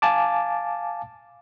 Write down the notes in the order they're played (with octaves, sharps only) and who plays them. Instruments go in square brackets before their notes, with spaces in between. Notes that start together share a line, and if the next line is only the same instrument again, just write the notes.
[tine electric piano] F5 G#5 A5 D6